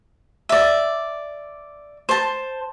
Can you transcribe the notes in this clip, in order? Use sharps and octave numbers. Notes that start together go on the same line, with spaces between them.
D5 E5
C5 A5